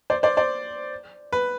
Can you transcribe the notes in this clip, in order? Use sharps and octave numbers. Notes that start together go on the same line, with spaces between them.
C5 D5
C5 D5
C5 D5
B4